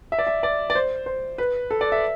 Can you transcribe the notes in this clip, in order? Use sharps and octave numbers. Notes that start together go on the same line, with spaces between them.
E5
D5
E5
D5
D5
C5
C5
B4
A4
D5
E5